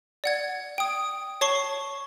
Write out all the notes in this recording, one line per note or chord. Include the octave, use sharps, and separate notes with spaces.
D5 F#5 G#6
G5 D#6
C#5 A5 C#6 C7 G7